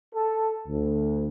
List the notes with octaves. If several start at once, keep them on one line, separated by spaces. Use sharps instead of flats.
A4
D2